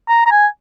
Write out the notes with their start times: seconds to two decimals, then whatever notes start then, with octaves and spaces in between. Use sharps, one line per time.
0.09 A#5
0.26 A#5
0.31 G#5